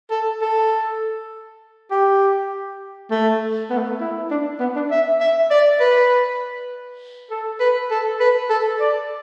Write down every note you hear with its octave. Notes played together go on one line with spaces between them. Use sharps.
A4
A4
G4
A3
B3
A3
B3
E4
D4
B3
D4
E5
E5
D5
B4
A4
B4
A4
B4
A4
D5